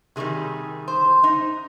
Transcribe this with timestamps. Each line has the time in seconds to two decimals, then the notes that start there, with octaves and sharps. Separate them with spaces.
0.16 C3 D#3 G3 G#4
0.88 C5
1.24 D#4